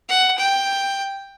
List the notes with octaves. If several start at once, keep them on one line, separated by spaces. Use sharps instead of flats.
F#5
G5